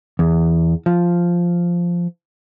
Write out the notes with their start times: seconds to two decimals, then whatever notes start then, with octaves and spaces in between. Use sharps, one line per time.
0.19 E2
0.86 F3